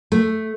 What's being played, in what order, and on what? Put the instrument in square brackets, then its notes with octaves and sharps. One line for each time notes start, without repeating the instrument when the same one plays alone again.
[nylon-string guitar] A3